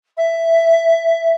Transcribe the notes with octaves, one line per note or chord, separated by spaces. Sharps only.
E5